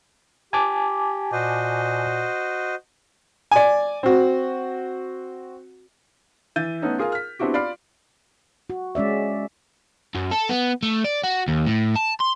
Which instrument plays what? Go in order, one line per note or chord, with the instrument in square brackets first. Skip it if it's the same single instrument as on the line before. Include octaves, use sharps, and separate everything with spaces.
[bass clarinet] G4 [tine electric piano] G#5 A5 D6
[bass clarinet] A#2 [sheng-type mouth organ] F#4 C5 D#5
[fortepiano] D5 G#5
C4 F#4
[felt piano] E3 E5 G6 A6 D#7
A3 B3 C#4 D#4
F4 G#4 A#4 F5
F6 B6
B3 C4 D4 E4 F#4 G4
F4 D5 B5 F6 C7 D7
[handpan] F#4
G#3 C#4 D5 E5
[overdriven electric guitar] F#2
A4
B3
A3
D5
F#4
D#2
A2
A5
C6